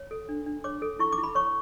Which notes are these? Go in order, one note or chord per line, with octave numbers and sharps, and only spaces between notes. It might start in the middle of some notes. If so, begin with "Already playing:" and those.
Already playing: C#5
A4
D4
D4
C#5 D6
A4
E4 C#6
D6
E4
B5
C#5 C#6